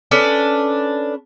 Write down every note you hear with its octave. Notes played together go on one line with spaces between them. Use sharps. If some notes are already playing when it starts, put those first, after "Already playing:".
C#4 D4 A4 B4